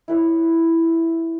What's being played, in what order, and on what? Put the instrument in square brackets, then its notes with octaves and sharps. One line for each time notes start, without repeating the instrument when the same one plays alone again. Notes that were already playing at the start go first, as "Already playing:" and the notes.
[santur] E4 B4 C#5